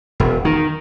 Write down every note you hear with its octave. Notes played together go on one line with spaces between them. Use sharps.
E1
D#3